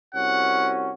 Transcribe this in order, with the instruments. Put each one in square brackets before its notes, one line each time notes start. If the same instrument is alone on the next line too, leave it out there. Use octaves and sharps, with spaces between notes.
[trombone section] C2 C#4 F#4 [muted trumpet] F#5